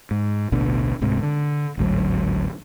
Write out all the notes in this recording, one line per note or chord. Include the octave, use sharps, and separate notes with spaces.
G#2
A1 D2 B2 D3
D1 G#2 C3
D3
G#1 D2 A2 F#3